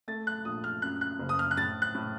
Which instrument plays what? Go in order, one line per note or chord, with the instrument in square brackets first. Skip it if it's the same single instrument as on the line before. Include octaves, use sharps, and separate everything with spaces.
[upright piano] A3 A6
F#6
A#1 D#6
F6
F#2 F#6
F#6
F#1
D#6
F6
F#6
A2 A6
F#6
A2